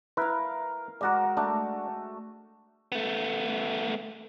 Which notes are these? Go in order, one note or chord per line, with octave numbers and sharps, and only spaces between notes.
E4 A#4 B4 F5
G#3 F#4 A#4 D5 F#5
A3 D4
A3 B3